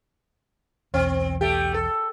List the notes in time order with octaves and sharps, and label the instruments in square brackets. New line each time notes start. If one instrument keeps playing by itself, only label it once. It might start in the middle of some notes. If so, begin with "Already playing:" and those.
[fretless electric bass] B1 E2 [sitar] C4
[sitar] A3 G4
A4